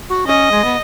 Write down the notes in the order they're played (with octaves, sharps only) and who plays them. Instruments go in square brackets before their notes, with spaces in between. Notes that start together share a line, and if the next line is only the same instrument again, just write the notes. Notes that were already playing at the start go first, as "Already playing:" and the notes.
[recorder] F#4
[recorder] C#4 [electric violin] D#5
[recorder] G#3
B3